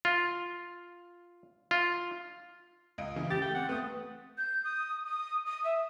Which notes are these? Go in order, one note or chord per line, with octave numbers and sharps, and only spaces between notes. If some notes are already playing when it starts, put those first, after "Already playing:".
F4
F4
C#2 D#5 D7
C#3 E3
G4 A6
A3 G5
C4 F#5
A3 B3 D#6
G6
D#6
D#6
D#6
E5